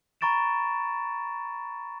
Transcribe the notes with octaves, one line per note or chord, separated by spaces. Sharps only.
A#5 B5 C#6 A6 D7 E7